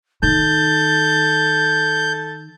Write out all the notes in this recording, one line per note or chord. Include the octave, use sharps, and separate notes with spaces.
D#3 A4 G6 A6